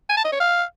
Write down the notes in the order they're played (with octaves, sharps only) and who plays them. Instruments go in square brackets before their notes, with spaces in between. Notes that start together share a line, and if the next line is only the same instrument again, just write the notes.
[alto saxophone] G#5
A5
D#5
C#5
F5